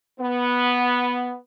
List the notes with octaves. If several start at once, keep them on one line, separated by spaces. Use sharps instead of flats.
B3